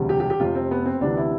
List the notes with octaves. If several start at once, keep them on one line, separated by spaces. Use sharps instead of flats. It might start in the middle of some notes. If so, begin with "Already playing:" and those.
Already playing: E1 D2 C3 G3
G4
G4
G4
F1 F2 C3 F4
C4
B3
C4
D2 C3 E3 D4
E4